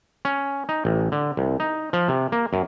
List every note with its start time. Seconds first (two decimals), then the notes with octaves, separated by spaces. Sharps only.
0.25 C#4
0.69 D#4
0.85 A1
1.12 D3
1.37 C2
1.60 D#4
1.93 F3
2.08 C3
2.32 A#3
2.53 F#2